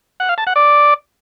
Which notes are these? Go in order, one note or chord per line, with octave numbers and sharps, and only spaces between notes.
F#5
F5
A5
F#5
D5